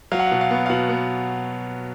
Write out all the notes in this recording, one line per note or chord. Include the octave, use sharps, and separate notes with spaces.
F#3 F5
F#5
B2 F5
F5
B3
F5
B2 F#5
B3